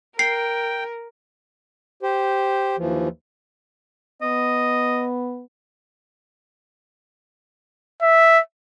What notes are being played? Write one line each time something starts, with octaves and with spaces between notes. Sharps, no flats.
A#4 G5 C7
G4 C5
D#2 E3 F3
B3 D#5
E5